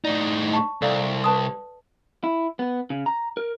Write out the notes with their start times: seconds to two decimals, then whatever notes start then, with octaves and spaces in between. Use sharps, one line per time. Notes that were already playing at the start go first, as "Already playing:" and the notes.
0.05 A2 D#4 D5
0.53 A5 C#6
0.82 C2 A4 D5 F5
1.24 B4 A5 D#6
2.24 E4
2.59 B3
2.90 C#3
3.06 A#5
3.37 A#4